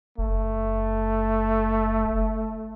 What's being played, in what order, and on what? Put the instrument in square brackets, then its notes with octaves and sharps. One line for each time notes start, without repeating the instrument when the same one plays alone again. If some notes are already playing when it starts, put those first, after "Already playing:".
[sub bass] F#1 [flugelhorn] A3